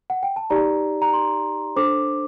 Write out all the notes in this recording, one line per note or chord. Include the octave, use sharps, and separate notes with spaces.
F#5
G5
A5
D#4 G4 D5 A#5
A#5
C6
D4 A4 C5 D6